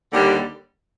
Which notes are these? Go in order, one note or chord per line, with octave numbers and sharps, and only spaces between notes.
D#2 D3 G3